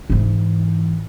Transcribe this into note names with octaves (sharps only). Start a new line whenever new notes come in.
G#2 E3